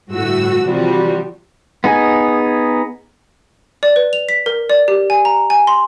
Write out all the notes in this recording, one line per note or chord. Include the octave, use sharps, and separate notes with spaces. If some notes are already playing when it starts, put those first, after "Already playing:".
G1 A2 A3 F#4 E6
C3 E3 F3 G3 F#4
B3 D#4 G#4 G#5
D5
B4
F7
B6
A#4
D5
G4
G#5
A#5
G#5
C6